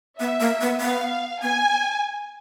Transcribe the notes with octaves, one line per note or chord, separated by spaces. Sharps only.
B3 E5
A#3
B3
B3 F5
B3 G#5